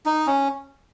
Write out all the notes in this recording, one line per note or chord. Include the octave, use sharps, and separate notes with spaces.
D#4
C#4